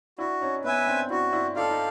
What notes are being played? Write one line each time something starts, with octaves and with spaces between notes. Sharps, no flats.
D4 E4 F#4
C#4 D#4
B3 C#4 B4 E5 G#5
C4 D4
D4 E4 F#4
D4 E4
D#4 F4 A4 D5 F5
D#4